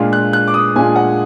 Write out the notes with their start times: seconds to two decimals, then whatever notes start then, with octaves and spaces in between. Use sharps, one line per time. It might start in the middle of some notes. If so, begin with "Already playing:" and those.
Already playing: A#2 G#3 D4 F4
0.13 F#6
0.33 F#6
0.48 D6
0.54 D#6
0.76 A#2 G#3 D4 F4 G#5
0.96 F#5